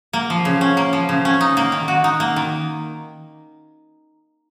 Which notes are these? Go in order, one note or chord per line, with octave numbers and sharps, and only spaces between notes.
A#3
F3
C#3
C#4
A#3
F3
C#3
C#4
D#4
A#3
D#3
F#4
D#4
A#3
D#3